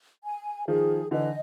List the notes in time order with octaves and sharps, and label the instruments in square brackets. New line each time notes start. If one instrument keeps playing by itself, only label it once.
[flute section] G#5
[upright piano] D#3 F3 [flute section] G#4
[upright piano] D3 E3 [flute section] D#5